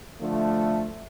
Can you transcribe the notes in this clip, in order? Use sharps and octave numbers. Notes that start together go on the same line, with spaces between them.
D3 F3 A3